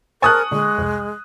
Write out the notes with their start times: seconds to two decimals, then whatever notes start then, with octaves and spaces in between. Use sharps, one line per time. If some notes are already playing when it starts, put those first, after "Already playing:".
0.22 A#4 C5 G#5 A5 C#6 D#6 F#6
0.51 A#2 D3 G#3
0.78 C2 F2